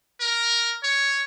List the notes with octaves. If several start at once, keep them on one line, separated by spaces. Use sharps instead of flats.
A#4
C#5